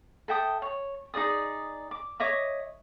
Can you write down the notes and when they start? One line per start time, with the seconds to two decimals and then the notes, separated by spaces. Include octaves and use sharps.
0.28 A4 E5 G5 D#6
0.62 C#5
1.14 D#4 G#4 D5 D#6
1.91 D6
2.20 C#5 D#5 E5 D6